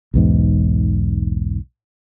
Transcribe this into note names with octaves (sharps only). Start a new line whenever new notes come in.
B1 E2 G#2